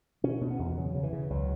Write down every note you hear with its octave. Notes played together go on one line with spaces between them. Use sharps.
B2 C#4
B2
B3
E2
C#3 F#3
C#3
E3
C#3
C#2 F#3